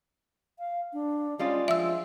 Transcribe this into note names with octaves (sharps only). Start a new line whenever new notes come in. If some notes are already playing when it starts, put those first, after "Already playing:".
F5
D4
G3 G#3 C#4 F4
F3 E5 E6